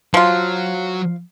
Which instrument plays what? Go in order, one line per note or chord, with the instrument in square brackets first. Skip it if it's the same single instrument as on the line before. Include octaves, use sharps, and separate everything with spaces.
[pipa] F3 F4 [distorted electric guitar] F#3